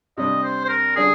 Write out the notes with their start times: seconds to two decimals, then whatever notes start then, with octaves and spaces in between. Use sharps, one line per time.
0.17 C3 G3 D4 D#5
0.43 C5
0.65 C5
0.69 A#4
0.95 D3 G3 G#4